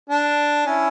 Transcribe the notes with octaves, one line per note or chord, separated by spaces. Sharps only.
D4
C#4 E4